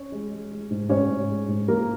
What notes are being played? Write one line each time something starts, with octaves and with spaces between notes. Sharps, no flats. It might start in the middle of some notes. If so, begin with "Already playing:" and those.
Already playing: C#4
G#3
G#3
G#3
G#2
G#2 C#4 C#5
G#2
G#3
G#2
F3 A#3 A#4